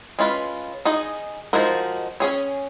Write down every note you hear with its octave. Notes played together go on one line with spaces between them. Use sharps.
G#3 C#4 F4 B4
D#4 G#4 D#5
F3 G#3 D#4 F#4 A#4
C#4 G#4 C#5